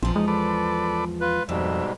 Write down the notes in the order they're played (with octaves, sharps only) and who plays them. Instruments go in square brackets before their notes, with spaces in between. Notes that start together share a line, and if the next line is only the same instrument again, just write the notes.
[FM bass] A#1 [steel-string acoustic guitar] E2 F3 [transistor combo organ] C4
[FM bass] G#3 [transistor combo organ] D#4
[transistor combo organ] A4 B4 D5
[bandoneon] F4 B4
[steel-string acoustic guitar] F2 [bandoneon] G#2 B2 G3 [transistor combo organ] E5